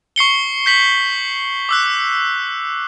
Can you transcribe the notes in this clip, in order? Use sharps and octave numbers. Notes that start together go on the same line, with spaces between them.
C#6 C7 C#7 G7
G6 B6 F#7
D6 E6 F#6